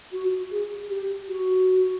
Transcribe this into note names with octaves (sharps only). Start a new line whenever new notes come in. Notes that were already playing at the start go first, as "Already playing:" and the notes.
F#4
G#4
G4
F#4